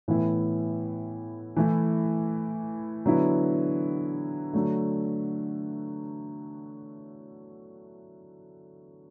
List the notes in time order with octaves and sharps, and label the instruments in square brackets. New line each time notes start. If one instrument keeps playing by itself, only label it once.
[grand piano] A2 E3 B3 E4
E3 A3 E4
D3 F#3 B3 E4
D3 F#3 A3